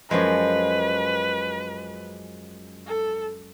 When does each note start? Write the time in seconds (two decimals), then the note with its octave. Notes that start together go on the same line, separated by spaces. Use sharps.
0.10 F#2 F3 G#3 B4
2.87 A4